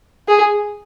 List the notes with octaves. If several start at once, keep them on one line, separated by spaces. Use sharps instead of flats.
G#4